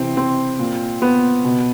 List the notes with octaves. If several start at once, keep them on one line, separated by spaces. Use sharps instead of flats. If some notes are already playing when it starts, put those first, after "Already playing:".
Already playing: C3 E3 C4
C4
A#2
B3
B2